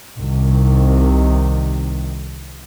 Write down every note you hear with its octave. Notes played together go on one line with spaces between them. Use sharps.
C2 C3 D#3